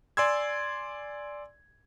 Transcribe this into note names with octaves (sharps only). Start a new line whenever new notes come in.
D5 G#5 C6 E6 G#6